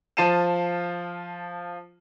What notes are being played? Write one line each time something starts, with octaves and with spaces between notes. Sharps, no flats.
F3 F4 A5 C7 D#7 E7